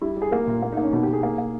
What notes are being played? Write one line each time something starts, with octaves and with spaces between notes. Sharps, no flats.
G3 E4
G3
G#4
A#3 A#4
A#2
A#3
D#4
A#3
C#4
B2 D#4
G4
B2
G#4
A#3
A#3